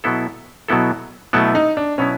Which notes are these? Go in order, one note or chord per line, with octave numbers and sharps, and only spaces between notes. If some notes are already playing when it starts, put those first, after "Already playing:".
B2 F#3 B3 E4 A4
B2 F#3 B3 E4 A4
B2 F#3 A3 B3 E4 A4
D#4
D4
B2 F#3 B3 C#4 E4